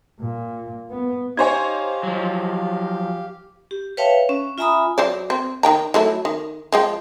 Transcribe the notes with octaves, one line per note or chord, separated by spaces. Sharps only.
A#2
B3
D#4 G4 C5 C#5 F5 G#5 G#6
F3 F#3
G4
B4 C#5 E5 F5 G5 A5
C#4
F4 E5 G#5 A#5 B5 D#6
F#3 C5 D5
C4
D#3 G5 A#5
F#3 A3 E4
D#3
F3 G#3 G5